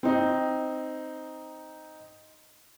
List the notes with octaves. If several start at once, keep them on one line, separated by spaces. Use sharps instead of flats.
C4 D#4